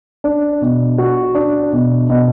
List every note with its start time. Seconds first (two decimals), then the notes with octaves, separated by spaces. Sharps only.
0.24 D4
0.61 B2
0.98 F#4
1.35 D4
1.73 B2
2.10 B2